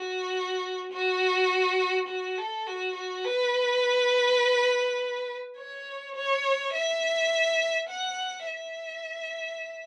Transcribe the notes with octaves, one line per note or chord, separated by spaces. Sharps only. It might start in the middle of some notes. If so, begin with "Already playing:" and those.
Already playing: F#4
F#4
F#4
A4
F#4
F#4
B4
C#5
C#5
E5
F#5
E5